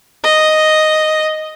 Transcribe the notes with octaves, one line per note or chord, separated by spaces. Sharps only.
D#5